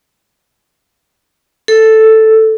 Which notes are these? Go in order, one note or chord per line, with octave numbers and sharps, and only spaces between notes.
A4